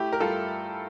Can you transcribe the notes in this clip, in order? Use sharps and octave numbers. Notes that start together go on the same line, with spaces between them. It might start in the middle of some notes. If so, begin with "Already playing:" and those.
Already playing: A3 E4 G4
A#4
G2 F4 A4